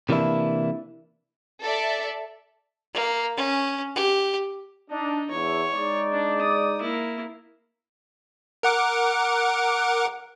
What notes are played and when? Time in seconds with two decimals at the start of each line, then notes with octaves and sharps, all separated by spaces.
0.09 C3 E3 A#3 D4 E4
1.62 A4 D5 E5
2.94 A#3
3.37 C#4
3.96 G4
4.91 D4 D#4
5.30 E2 E4 C#5
5.73 G#3 D#4 D5
6.12 D4
6.41 D#6
6.81 A#3 E4
8.63 A#4 F#5 D6